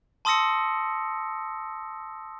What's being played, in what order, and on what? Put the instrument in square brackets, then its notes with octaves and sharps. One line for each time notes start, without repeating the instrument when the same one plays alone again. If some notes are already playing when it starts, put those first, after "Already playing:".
[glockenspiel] A5 C6 D#6 E6 A#6 C#7